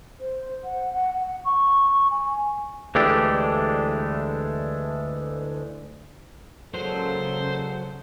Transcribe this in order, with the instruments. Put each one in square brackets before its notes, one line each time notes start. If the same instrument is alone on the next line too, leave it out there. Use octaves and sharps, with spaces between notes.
[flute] C5
F#5
F#5
F#5
C#6
G#5
[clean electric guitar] D2 E3 G#3 A3 D4 G4
[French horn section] A#2 G#3 A4 [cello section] C#3 [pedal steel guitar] F#3 [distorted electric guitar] C5